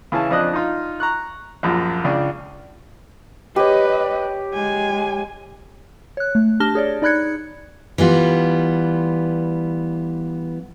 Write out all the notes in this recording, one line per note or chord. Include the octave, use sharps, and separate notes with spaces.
C#3 E3 C#4 A5
F2 D4 C5 D#5 D#6 F#6
D#4 F4
A#5 C#6 F#6
A#1 F#2 F3
C#2 C#3 D4
G4 B4 C#5 D#5
G#3 G#5
C#5 F#6
A3
D4 G4 A5 F6 A#6 G7
G#4 C#5 D5
D#4 D5 B5 F#6 G#6 C#7
E3 G3 B3 F4